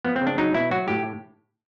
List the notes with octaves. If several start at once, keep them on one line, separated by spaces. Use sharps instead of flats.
F3 B3
C4
C#3
D4
F#3 D#4
B2 E4
F#3 F#4
A2 G4